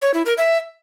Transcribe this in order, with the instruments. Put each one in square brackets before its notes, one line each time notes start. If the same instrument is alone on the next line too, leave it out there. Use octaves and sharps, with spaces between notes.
[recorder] C#5
E4
A#4
E5